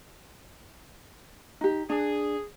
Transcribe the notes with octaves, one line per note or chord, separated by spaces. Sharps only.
D#4 G4
D4 G#4